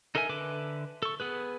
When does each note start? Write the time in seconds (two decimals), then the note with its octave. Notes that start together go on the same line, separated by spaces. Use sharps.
0.15 D#4 A4 A#4 E5 G#5
0.29 D3 A4 B4 E5 D6
1.03 A4 C#6
1.20 B3 G#4 B4